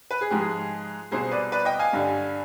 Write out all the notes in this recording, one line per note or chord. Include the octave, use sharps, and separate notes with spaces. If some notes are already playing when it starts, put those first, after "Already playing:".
B4
G#4
G#2 F3 G#3 G4
G#4
C2 B2 B3 G#4 C5
B4 D5
B4 D5
D#5 G5
F5 G#5
G2 D3 G3